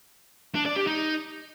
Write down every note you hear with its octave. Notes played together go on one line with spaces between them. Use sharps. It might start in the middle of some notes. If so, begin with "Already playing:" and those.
D4
D5
G4
D#4